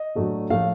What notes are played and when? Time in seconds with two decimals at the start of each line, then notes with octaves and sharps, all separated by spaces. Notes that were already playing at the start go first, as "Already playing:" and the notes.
Already playing: D#5
0.15 A2 F#3 A3 D4
0.50 A2 F3 A3 F5